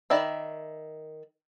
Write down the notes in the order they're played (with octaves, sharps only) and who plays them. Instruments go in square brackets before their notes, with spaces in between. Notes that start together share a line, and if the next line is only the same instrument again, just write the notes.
[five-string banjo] D#3 D5 E5 B5